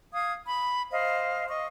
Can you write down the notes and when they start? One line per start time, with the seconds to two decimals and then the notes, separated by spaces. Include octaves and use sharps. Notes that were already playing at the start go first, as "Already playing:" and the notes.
0.13 F5 D#6 G#6
0.46 B5
0.91 C5 D#5 F5
1.48 D#5 C#6